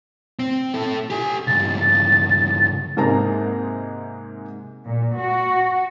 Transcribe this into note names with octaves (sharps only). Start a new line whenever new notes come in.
C4
E4 A4
G4 G#5
C#2 G2 A6
G#2 C3 G#3 A#3 D#4 A#5
A#2
F#4